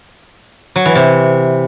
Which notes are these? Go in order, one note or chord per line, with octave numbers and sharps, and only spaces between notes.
F#3
E3
C3